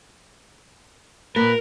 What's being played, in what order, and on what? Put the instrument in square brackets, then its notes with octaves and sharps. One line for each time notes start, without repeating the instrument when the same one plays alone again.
[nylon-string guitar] A#2 A#3 [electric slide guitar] A#4 [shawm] B4